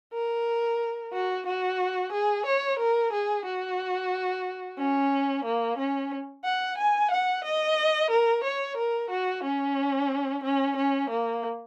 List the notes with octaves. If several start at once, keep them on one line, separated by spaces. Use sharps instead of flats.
A#4
F#4
F#4
G#4
C#5
A#4
G#4
F#4
C#4
A#3
C#4
F#5
G#5
F#5
D#5
A#4
C#5
A#4
F#4
C#4
C#4
C#4
A#3